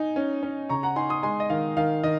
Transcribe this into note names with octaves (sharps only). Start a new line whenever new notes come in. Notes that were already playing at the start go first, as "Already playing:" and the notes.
Already playing: D#4 G#5
C#4
C#4
C#3 A#5 C#6
F#5 A#5
D#4 G#5 C6
C6 D#6
G#3 G#5 C6
D#5
D#3 F5
D#3 F5
D#3 D#5